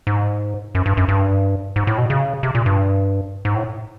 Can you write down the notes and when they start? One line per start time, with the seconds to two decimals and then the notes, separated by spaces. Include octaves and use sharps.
0.07 G#2
0.75 F#2
0.86 G2
0.97 F#2
1.08 G2
1.76 G#2
1.87 A2
1.98 B2
2.10 C#3
2.43 C3
2.55 A#2
2.66 G2
3.45 G#2
3.56 A2